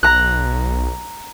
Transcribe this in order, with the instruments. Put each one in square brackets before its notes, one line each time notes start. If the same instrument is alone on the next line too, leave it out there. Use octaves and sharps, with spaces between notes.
[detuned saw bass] B1 [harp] A#5 F#6